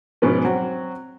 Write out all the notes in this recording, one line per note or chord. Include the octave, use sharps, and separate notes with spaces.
G#2 B2 F3 C#4
F#3 C4 F#4